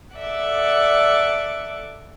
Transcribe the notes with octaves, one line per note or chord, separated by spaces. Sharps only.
A4 D5 E5 F#5 D6